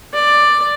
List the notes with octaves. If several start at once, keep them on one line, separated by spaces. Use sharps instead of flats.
D5